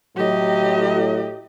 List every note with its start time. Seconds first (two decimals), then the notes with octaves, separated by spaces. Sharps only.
0.16 A2 F#3 G4 D#5